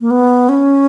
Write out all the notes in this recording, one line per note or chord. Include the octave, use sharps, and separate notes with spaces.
A#3
B3
C#4